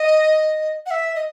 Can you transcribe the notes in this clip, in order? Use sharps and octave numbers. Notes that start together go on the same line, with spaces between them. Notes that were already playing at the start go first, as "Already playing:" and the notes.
Already playing: D#5
F#5
E5
D#5